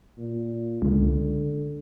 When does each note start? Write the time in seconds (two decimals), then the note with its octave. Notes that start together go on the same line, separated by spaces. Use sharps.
0.18 A#2
0.82 C#2 D3